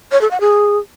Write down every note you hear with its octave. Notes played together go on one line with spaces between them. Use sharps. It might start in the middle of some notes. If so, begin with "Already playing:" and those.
C#5
A4
F#5
G#4